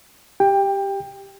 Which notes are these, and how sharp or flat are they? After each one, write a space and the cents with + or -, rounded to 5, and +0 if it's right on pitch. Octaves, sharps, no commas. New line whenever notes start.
G4 +0 G5 +20